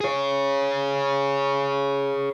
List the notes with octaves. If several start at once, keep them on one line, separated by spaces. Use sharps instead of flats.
G#4 C#5